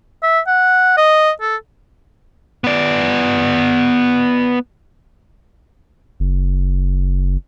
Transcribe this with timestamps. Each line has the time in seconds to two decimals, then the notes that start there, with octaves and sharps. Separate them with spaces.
0.23 E5
0.47 F#5
0.97 D#5
1.41 A4
2.64 B3 D5
6.20 F#1